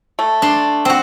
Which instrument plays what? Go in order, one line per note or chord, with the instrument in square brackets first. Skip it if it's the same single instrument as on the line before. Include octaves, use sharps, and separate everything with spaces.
[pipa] A3
[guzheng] D4 C6
C4 F#4